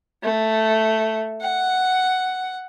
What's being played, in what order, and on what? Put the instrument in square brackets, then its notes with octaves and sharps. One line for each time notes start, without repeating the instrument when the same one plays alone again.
[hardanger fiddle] A3
F#5